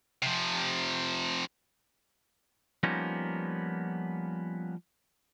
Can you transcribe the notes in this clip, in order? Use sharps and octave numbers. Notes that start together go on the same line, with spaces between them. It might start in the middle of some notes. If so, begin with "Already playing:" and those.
C3 F3
F3 G3 A#3 B3 C#4 D#4